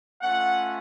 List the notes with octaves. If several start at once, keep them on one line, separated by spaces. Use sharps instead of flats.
A3 C#4 F4 F#5